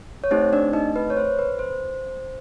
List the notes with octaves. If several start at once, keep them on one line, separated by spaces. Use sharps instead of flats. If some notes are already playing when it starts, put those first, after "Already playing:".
C#5
A3 C4 D#4 G4 C5
D4 D5
D#4 D#5
B4
C#5
C5
B4
C5